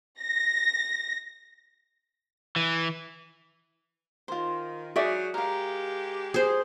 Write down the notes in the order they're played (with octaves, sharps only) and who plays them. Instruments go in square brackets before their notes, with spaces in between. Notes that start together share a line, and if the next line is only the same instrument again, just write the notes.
[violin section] A#6
[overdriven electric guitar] E3
[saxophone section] D#3 [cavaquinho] F4 C5
[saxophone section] F#3 G#3 D#4 [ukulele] F#4 D5 E5 [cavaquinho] G#4
[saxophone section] G#3 G4 [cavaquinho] A#4 F5
[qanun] G#4 C5